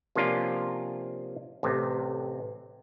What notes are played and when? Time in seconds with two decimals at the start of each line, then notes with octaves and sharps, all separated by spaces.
0.16 C3 F3 A#3 C#4 D4 F4
1.63 A1 C3